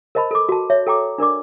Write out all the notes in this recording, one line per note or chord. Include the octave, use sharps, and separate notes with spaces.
A#4 C5 D#5 A5 B5
A4 D6
F#4 A5
C#5 E5
A4 G5 A#5 D6
D4 A#4 D5 D6